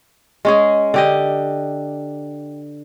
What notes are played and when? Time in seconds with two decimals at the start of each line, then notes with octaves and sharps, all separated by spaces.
0.45 G#3 C#4 G#4
0.94 D3 G4 D#5